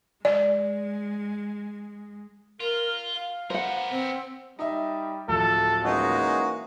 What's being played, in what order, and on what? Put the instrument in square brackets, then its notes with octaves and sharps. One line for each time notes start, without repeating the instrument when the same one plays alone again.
[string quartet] G#3 [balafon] D5
[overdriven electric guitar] F4 [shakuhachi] A#4
[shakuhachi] F5
[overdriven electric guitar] B3 A#4 [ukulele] C5 F#5
[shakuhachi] C4
[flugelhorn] G3 [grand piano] D#4 D#5 E5
[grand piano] D1 F3 [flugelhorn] A4
[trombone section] E3 A#3 C#4 [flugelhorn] G#3 [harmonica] D#4 F#4